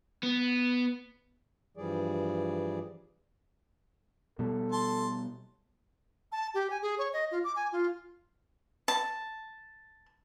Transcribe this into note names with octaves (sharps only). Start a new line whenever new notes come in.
B3
G2 E3 F3 G3 G#4 D5
B2 G3 A4
A5 C6
A5
G4
G#5
G#4
C#5
D#5
F4
D6
G#5
F4
A5